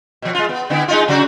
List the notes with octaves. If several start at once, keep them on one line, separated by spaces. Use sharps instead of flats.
B2 F3
G#3 F4
B3
D3 B3 E4
G#3 D#4 F4
C#3 F#3 F#4